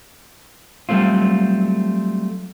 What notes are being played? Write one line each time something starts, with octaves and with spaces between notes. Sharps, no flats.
F#3 G3 A3 C4 F4